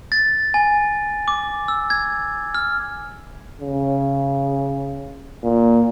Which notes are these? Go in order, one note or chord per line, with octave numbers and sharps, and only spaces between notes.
A6
G#5
D6
E6
G#6
F6
C#3
A#2